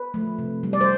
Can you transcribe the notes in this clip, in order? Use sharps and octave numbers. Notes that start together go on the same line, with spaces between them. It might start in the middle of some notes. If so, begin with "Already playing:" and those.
Already playing: B4
F3 A3
C3
G3
D5
C5